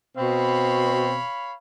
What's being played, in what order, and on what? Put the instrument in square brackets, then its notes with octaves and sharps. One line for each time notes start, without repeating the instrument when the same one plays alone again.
[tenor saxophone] B2 [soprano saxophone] C4 [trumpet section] C#5 F5 B5